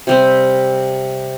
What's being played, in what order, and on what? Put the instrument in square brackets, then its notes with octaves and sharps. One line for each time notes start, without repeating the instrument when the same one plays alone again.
[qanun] C3 G3 C4